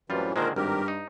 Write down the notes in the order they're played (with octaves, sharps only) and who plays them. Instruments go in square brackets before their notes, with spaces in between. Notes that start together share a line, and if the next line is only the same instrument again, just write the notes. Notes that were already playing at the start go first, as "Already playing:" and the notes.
[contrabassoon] F#2 [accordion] A2 C3 E3 [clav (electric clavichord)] G3 F4
[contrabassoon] A#2 [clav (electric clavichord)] D3 D#3 G#3 [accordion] A#4 C5
[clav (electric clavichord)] G#1 [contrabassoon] G2 [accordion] G4 A#4
[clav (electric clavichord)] D#4